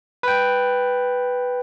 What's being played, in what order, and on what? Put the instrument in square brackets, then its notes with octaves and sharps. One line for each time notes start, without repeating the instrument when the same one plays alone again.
[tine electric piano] B4 G5